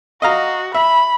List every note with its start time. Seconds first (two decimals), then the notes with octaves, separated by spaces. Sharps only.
0.22 F#4 D#5 F5 A#5
0.75 E5 B5